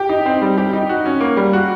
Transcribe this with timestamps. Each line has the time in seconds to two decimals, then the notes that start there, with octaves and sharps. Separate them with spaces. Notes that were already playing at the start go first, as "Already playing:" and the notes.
Already playing: G4
0.09 D#4
0.26 C4
0.42 G3
0.58 G4
0.73 D#4
0.89 F#4
1.06 C#4
1.21 A#3
1.37 G3
1.53 F#4